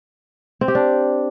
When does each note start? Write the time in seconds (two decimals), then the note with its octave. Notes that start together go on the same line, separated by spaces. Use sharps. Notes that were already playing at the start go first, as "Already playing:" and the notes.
0.61 C4
0.68 G4
0.75 D4